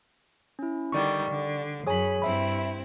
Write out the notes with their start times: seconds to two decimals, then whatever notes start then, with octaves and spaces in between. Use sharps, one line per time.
0.59 C#4 E4
0.92 D3 D#3 G3 D5 C#6
1.29 D3
1.86 F#2 G#4 C#5 G#5 B5
2.22 G2 C4 E4 E5 B5